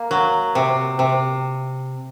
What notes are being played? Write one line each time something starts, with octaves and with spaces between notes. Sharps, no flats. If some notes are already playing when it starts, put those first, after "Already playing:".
Already playing: A#3
F#3
C3
C3